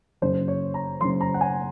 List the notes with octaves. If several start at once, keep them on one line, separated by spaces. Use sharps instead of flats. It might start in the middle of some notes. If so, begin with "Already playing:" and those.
F#1 F#2 C#3 C5
C#5
A#5
F#1 F#2 C#3 C6
A#5
F#5
G#5